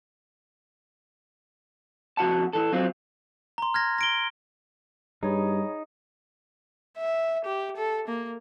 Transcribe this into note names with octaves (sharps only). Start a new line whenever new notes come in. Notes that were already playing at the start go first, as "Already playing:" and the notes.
F2 F#4 F#5 A5
E3 A4
F#3 C4 F4
A#5 C6
F6 G#6 A#6
A#6 D7 G7
G2 G3 D#4 G#4 C#5 B5
E5
G4
A4
A#3